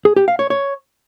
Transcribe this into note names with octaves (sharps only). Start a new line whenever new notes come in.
G#4
G4
F5
C#5
C#5